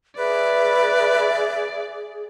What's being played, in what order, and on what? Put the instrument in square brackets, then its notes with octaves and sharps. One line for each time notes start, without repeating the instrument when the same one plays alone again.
[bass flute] G#4 [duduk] B4 [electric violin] D5 [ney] E5